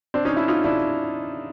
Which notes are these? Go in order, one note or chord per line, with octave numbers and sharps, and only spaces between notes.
C4 D4
C#4 D#4
D4 E4
D#4 F4
D4 E4